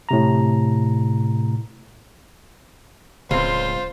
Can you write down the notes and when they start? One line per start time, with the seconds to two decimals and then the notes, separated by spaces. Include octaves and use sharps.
0.09 A2 C3 A#5
3.31 D1 C#2 C4 F4 C5